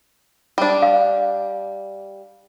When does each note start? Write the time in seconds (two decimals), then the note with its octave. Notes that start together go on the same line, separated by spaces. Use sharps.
0.58 G3 D4
0.82 F5